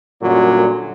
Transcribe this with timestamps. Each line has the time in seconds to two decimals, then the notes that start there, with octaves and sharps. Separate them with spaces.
0.22 F#2 A#2 D3 F#3 G3